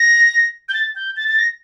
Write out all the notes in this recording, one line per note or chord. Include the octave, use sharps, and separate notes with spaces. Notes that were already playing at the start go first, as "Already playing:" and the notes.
Already playing: A#6
G6
A6
G6
A6
A6
A#6